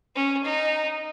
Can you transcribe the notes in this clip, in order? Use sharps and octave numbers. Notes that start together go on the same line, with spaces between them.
C#4
D#4